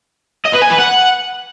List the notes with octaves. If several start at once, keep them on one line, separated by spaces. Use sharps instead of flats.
D#5
B4
G#5
B4
F#5